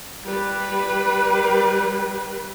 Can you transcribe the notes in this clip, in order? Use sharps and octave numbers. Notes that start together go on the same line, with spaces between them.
G3 B4